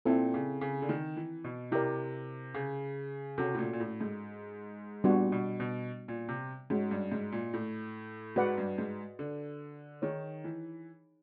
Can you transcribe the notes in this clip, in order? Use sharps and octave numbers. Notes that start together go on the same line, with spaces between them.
A#2 C4 E4 A4
C#3
C#3
D3
D#3
E3
B2
C3 E4 G4 A#4 D5
C#3
C3 C#4 F#4 A4
A2
A#2
A#2
A2
G#2
A#2 G3 B3 D4 F#4
B2
B2
A#2
C3
G#2 G#3 C#4 F#4
G2
G#2
A#2
A2
G#2 F#4 B4 D5 F#5
G2
G#2
D3
D#3 D#4 G#4 C#5
E3